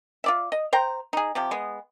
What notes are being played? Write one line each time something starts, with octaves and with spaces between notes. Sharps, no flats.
F4 D5 E5
D#5
C5 G5 A#5
D#4 G#4
C3 F3 G4
G#3 B3